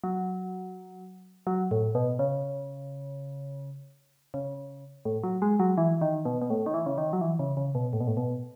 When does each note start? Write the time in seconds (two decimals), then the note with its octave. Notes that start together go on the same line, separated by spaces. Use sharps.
0.04 F#3
1.47 F#3
1.71 A2
1.95 B2
2.19 C#3
4.34 C#3
5.05 A2
5.24 F#3
5.42 G#3
5.59 F#3
5.78 E3
6.01 D#3
6.25 B2
6.42 B2
6.50 A2
6.66 D#3
6.74 E3
6.86 C#3
6.98 D#3
7.13 F#3
7.21 E3
7.39 C#3
7.57 C#3
7.75 B2
7.93 A2
8.00 B2
8.08 A2
8.17 B2